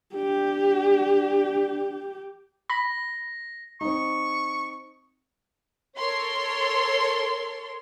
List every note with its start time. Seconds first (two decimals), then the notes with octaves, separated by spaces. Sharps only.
0.15 D4 G4
2.70 B5 A#6
3.81 C4 D#4 C#6
5.98 A4 A#4 C#5 C6